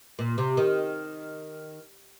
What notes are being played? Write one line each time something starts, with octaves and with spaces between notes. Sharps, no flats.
A#2
C3
D#3